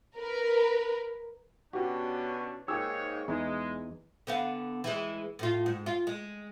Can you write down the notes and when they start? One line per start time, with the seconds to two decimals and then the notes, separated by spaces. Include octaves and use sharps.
0.17 A#4 B4
1.73 B2 C#4 D4 F#4 G4
2.68 G#2 A#3 G4 G#4 C#5 E6
3.28 E2 E3 G#3 D#4
4.27 D3 B3 F5
4.84 E3 G#3
5.39 A2 F4
5.66 G#2
5.86 F4
6.07 G#3